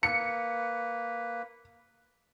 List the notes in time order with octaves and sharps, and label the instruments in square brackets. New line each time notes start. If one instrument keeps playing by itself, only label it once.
[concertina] A#3 B4 [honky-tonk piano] C#7